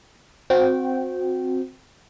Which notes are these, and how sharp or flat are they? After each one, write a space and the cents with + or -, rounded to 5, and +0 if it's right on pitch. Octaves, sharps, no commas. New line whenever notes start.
C4 +0 F#4 -25 G5 -15